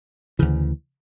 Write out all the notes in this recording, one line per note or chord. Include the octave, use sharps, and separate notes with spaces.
D2 C#3 E3